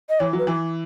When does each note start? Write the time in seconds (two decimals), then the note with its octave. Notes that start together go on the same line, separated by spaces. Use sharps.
0.10 D#5
0.20 E3 C#5
0.33 F#3
0.39 B4
0.47 E3